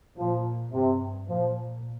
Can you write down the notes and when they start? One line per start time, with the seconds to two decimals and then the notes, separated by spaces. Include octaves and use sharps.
0.17 A#2 F3
0.72 G2 C3
1.28 A#2 F3